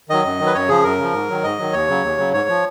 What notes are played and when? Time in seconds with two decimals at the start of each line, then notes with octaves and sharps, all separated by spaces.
0.09 D#3 F#3 D#5
0.25 F#2
0.39 D#3 F#3
0.46 B4
0.54 F#2 C#5
0.69 C#3 F3 G#4
0.83 F#2 A#4
0.98 C#3 F3
1.14 G#2
1.29 D#3 F#3
1.43 G#2 D#5
1.58 D#3 F#3
1.73 D#2 C#5
1.88 C#3 F#3
2.03 D#2
2.18 C#3 F#3
2.33 G#2 C#5
2.49 F3